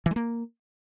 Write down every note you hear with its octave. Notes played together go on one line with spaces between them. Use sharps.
E3
G#3
A#3